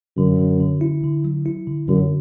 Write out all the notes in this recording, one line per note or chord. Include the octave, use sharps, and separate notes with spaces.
F#2 D3
D3
D3
E4
D3
F#3
E4
D3
F#2 D3